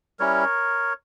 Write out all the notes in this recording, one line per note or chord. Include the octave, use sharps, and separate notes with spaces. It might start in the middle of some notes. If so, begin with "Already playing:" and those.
G3 C#4 E4 A#4 C#5